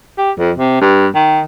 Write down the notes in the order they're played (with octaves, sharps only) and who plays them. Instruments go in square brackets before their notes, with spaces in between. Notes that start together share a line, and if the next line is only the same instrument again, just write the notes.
[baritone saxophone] G4
F2
C3
G2
D#3